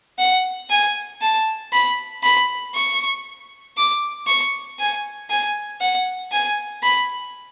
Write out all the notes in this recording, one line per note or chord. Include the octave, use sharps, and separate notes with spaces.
F#5
G#5
A5
B5
B5
C#6
D6
C#6
G#5
G#5
F#5
G#5
B5